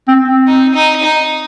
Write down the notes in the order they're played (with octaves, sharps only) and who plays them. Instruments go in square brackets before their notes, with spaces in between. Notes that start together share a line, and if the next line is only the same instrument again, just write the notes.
[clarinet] C4
C4
[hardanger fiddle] D#4
D#4
D#4